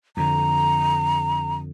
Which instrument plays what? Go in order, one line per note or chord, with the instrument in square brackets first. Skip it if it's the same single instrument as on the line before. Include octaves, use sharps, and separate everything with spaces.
[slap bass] F2 D3 [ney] A#5